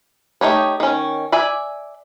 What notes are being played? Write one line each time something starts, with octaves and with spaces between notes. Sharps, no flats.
A3 D#4 G4 C#5
D#3 C#4
D5 E5 G#5